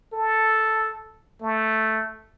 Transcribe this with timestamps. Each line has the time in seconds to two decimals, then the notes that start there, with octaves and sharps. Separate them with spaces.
0.13 A4
1.42 A3